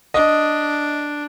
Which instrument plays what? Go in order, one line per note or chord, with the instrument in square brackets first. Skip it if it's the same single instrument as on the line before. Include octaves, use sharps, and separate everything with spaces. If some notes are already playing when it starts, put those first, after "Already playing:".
[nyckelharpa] D4 [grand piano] D#5